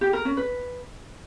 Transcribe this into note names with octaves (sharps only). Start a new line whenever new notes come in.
G4
A#4
C#4
B4